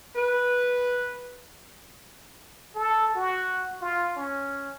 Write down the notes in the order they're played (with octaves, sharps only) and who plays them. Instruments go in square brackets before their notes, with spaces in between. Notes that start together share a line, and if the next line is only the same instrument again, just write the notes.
[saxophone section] B4
[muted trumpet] A4
F#4
F4
C#4